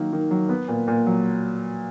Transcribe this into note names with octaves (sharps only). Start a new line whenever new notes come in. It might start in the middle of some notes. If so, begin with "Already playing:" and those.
Already playing: D#3 F#3 A#3
D#3
F#3
B3
A#2
A#2
F#3